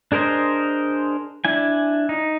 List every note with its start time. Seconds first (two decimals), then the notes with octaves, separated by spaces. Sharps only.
0.12 D4 G#4 A#4 C5 D#5
1.45 D4 E4 G#5
2.09 D#4